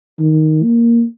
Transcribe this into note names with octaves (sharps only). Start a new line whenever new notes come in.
D#3
A#3